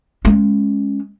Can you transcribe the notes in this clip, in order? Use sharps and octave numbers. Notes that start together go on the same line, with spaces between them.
G#3 C#4